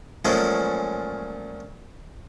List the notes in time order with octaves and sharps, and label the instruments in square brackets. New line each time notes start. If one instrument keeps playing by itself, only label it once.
[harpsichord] A#2 F3 F#3 G#3 A3 C#4